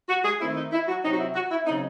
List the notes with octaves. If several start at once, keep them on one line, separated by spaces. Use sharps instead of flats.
F#4
G#4
D#3 A3 C4 E4
D#4
E4
F#4
C3 F#3 C4 D#4
F#4
E4
F#4
E4
C#3 F#3 C4 D#4